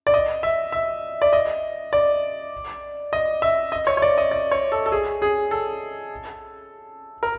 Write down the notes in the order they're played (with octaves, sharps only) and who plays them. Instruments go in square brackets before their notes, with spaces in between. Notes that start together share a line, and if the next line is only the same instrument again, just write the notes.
[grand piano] D5
D#5
E5
E5
D5
D#5
D5
D#5
E5
D#5
C#5
C#5
D5
D#5
D5
C#5
A4
A4
G#4
G#4
A4
A#4